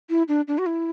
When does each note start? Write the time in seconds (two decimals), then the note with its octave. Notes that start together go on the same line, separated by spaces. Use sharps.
0.10 E4
0.28 D4
0.48 D4
0.58 F#4
0.66 E4